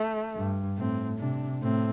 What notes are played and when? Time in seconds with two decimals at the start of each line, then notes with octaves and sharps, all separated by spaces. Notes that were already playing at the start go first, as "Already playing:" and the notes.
Already playing: A3
0.35 G2
0.77 A2 C4
1.19 C3 D4
1.62 A2 C4